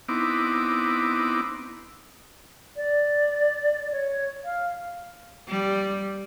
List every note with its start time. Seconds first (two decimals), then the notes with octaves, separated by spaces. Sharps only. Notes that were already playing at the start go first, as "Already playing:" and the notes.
0.08 B3 C4 D#4 E4 D6
2.76 D5
3.92 C#5
4.45 F5
5.48 G3